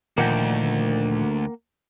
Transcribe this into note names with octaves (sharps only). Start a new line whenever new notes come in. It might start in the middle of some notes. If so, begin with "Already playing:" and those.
D2 A#2 D#3 F3 A#3 F#5 G5